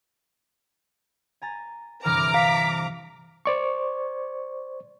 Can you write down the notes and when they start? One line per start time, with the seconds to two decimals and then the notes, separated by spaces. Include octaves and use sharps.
1.42 G#5 A#5 A6
2.05 G1 C3 E3 A#5 D6 F6
2.34 F5 B6
3.46 C5 D5 C#6